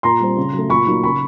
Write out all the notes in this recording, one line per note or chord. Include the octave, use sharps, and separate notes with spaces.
A#2 A#5 C6
G3 C4
C#3
F#3 A3
A#2 B5 C#6
F#3 A#3 D#4
C#3 B5 C#6